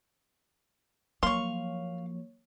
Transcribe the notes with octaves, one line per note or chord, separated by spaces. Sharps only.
F3 F#3 A#3 C#5 F5 C6 C#6